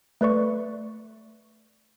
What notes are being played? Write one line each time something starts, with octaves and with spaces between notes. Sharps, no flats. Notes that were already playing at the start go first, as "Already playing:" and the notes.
A3 B4 D5 C#6